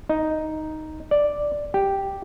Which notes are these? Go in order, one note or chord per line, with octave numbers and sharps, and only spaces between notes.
D#4
D5
G4